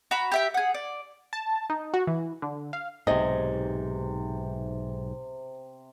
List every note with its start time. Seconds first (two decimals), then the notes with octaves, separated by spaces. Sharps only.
0.11 F#4 A#5 B5
0.32 G4 E5 G5
0.54 G#4 F#5
0.74 D5
1.33 A5
1.70 D#4
1.94 F#4
2.07 E3
2.42 D3
2.73 F5
3.07 B1 G#2 C3 D#5